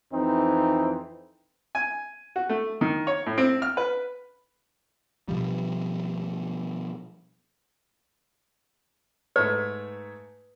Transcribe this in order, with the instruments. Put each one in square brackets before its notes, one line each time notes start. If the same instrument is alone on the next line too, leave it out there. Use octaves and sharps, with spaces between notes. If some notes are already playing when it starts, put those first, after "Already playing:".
[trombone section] F2 E3 C4 D#4
[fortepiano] G#5
F#4
A3
D#3
C#5
A2
C4
F6
B4
[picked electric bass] B2 F3 G3
[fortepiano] G#2 A3 C#5 [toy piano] B4